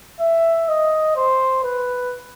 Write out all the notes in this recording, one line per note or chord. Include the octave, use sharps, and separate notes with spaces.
E5
D#5
C5
B4